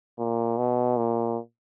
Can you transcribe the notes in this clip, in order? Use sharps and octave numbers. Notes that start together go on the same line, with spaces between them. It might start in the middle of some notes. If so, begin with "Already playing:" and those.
A#2
B2
A#2